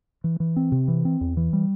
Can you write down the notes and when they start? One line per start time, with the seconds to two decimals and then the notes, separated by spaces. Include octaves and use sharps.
0.24 E3
0.40 E3
0.56 C4
0.72 C3
0.88 E3
1.05 C4
1.21 E2
1.37 E3
1.53 G3